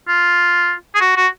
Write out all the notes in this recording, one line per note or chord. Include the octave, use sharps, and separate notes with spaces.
F4
G#4
F#4
F#4